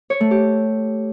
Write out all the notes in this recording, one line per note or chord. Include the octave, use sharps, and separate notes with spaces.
C#5
A3
G4